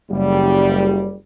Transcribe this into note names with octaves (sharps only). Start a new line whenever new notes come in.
F#1 G3